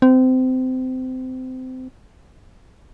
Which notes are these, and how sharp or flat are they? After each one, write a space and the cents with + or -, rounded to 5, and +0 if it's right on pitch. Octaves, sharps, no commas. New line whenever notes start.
C4 -25